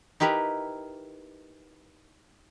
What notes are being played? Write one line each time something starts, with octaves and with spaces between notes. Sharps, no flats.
D#4 E4 G4 A#4 B4